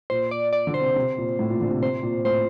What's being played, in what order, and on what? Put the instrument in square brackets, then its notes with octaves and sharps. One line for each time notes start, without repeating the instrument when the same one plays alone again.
[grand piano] A#2 [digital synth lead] C5
[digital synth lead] D5
D5
[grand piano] D3
[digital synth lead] C5
[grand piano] C3
C3
A#2
A2
A#2
D3
C3
[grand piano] C3 [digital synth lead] C5
[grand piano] A#2
[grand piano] A2 [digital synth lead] C5